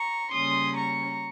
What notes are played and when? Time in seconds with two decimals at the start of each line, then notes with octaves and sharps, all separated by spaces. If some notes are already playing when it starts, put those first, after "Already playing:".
Already playing: A#5 C#6
0.33 C#3 G3 A#3 C#4 C6 D#6
0.76 A#5 C#6